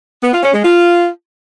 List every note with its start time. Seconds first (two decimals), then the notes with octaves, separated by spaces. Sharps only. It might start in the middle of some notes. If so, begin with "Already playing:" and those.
0.23 B3
0.33 F4
0.43 C#4
0.54 G#3
0.64 F4